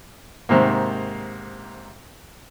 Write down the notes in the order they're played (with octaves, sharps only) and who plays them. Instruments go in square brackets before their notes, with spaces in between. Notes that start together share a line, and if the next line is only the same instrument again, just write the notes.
[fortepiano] G#2 C3 D#3 A#3